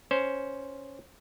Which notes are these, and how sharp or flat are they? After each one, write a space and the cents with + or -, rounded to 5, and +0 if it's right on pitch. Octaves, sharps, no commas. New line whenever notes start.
C#4 +0 C5 +0